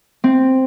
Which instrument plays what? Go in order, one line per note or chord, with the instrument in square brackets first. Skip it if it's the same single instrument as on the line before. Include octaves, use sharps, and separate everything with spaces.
[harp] C4